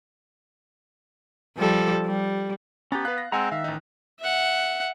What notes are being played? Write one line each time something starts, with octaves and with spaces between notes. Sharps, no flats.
F3 G3 A4
G3
B3 C#4 G4 A#5 A6
B4 F5 F#6
A#6
G#3 C4 F#5 G#5 A#5 E6
D#3 E5 F5
A1 D#4
E5 F#5